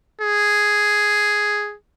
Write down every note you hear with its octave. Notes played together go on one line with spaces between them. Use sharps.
G#4